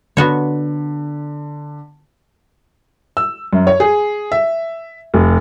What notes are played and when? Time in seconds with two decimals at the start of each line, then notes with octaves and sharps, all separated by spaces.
0.17 D3 B3 F#4 C#5
3.17 E6
3.53 F#2
3.67 C#5
3.80 G#4
4.32 E5
5.14 F1